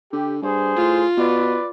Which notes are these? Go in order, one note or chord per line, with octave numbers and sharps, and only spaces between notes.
D3 G4
G2 G#4 C5
A2 F4
B2 B4 D5